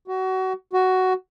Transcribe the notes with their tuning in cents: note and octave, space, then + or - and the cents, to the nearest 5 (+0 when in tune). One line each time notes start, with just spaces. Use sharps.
F#4 +25
F#4 +10